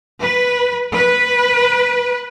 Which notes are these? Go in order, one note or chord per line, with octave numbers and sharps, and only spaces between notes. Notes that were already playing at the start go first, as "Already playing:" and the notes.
B4
B4